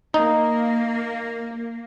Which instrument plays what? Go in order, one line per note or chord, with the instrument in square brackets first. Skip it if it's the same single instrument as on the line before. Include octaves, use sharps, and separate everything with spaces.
[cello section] A#3 [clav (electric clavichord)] D#4